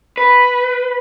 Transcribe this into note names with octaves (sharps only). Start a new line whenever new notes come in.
B4